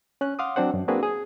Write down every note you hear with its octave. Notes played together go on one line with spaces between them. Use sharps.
C#4 F#6
F5 F#5 C6 D6 D#6
F#3 C4 D4 C5 F#5
F#2
A#3 C4 D4 F#4 G#4 B4
G#4